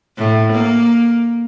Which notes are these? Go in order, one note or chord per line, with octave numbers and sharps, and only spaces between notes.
A2
A#3